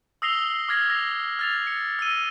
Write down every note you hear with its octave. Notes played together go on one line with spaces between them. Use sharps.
D#6 E6 A#6 C7 F7 G7
D6 F6 G#6 A#6 C7
E6 A#6 F7
F6 A6 F7
C#7
E6 A#6 D#7